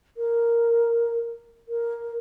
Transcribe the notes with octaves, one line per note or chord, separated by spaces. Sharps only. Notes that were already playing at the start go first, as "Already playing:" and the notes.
A#4
A#4